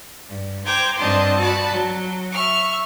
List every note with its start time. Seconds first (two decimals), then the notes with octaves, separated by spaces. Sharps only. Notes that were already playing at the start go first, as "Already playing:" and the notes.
0.29 G2
0.64 C5 G5 A#5 D6 G#6
0.97 G2 C4 D4 D#5 A5 C6
1.36 F#4 D5 A5 B5
1.69 F#3
2.32 E5 C#6 F6